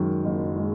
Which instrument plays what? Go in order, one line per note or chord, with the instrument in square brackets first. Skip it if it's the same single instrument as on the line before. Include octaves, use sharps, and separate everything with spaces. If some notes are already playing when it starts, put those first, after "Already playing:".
Already playing: [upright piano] F#2 D#3 G#3
F#1
G#3